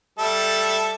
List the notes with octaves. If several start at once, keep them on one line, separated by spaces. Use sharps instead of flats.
G3 A4 E5